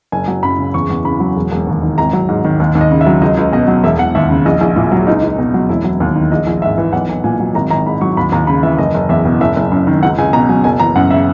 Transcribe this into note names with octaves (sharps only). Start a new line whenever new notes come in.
F#1 G#5
F#3
F#2 B5
C#3
E2 C#6
E2
C#3 B5
F#3
E1
E1
D#2
D#3
G#1 A#5
F#3
G#2
D#3
D#2
D#2
D#5
C#3
E5
F#3
C#2 D#5
C#2
B2 D#5
F#3
E1 E5
E1 F#5
D#2 E5
C#3
A#1 D#5
A#1
A#2 E4
F#3
C#2 D#4
C#2
B2
F#3
E1 E4
F#3
D#2
D#3
A#1 D#5
A#1
G#2 E5
E3
B1 F#5
B1
A#2 G#5
F#3
G#1 A#5
G#1 A#5
G#2 B5
F#3 C#6
D#2 B5
D#2 A#5
C#3 B5
E3 E5
F#1 D#5
F#1
E2 E5
B2
F#1 E5
F#1
F#2
D#3
C#2 F#5
C#2 G#5
B2 A#5
F#3 G#5
F#1 G#5
E3 A#5
F#2 F#5
C#3 E5